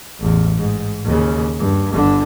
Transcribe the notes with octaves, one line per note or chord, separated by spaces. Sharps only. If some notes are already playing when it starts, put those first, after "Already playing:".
A1 E2
G#2
D#2 C#3
G2
G1 D3